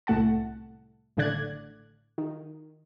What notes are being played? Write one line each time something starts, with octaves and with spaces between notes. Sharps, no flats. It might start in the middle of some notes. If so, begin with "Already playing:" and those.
C2 A2 A3 F#5 A5
A1 A2 D3 D5 F#6 G#6
D#3